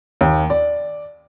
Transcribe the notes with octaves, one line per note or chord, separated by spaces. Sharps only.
D#2
D5